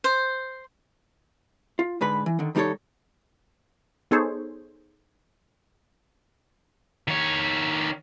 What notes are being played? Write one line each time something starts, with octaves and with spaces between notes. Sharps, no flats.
C5
F4
G#2 D3 B4 B5
E3
D3 D#3
D#3 G3 D#4 G4 A4 C#5
B3 D#4 G#4 A4 C5 C#5
D#3 C#5